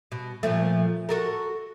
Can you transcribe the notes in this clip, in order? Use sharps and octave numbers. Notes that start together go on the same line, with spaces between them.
B2
A#2 F3 A3
F#4 A4 A#4